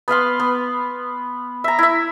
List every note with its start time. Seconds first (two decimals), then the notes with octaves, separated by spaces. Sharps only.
0.08 B3 B4 F5 C6
0.40 B3
1.64 E5 A#5
1.79 E4 E5